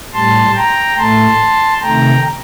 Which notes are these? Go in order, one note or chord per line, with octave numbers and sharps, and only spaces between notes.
A2 G3 A5 C6
G5 A#5
A2 A3 A5 C6
C3 D#3 A3 G5 A#5